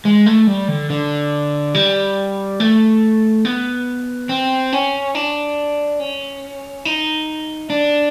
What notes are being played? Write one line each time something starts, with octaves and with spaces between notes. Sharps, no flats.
G#3
A3
G3
D3
D3
G3
A3
B3
C4
C#4
D4
C#4
D#4
D4